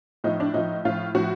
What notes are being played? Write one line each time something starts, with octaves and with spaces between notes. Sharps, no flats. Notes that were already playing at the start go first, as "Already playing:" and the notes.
A2 F3 D#4
D4
A2 F3 D#4
A2 F3 F4
A2 F3 F#4